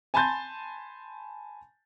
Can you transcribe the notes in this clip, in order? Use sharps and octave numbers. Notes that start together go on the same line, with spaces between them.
G#5 A5 B5 C6 G6 A6